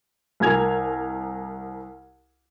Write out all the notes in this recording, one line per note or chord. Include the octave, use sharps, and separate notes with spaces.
C2 A#4 G#5 G#6 F7